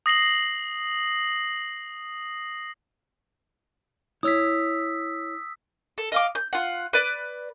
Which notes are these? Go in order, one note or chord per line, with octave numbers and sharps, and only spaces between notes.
D#6 A#6 C7 F#7
E4 C#5 D#6 E6 B6
A4
D#5 F5 D6
G6
F4 F#5
B4 D5